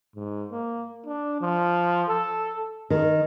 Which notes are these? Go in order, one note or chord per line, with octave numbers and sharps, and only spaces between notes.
G#2
A#3
D4
F3
A4
D#3